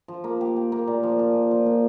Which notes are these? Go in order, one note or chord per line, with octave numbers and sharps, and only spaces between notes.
F3
A#3
G4
G4
A#3
A#2
F3
F3
A#2
F3
A#2